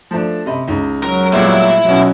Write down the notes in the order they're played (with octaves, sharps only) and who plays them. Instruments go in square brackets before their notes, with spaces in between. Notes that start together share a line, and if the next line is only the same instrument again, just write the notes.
[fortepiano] F3 A3 D4
C3 D#5 B5
C#2 D#4
[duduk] F#3 [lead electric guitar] A#4
[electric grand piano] A#2 G3 [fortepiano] G#3 B3 [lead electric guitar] E4 E5
[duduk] B2 [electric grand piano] F#3 C#4